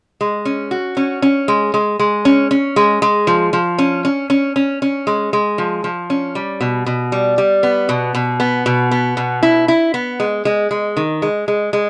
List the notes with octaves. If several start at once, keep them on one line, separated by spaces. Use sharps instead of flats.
G#3
C#4
F#4
C#4
C#4
G#3
G#3
G#3
C#4
C#4
G#3
G#3
F3
F3
C#4
C#4
C#4
C#4
C#4
G#3
G#3
F3
F3
C#4
G3
B2
B2
G3
G3
B3
B2
B2
B3
B2
B3
B2
E4
E4
B3
G#3
G#3
G#3
D#3
G#3
G#3
G#3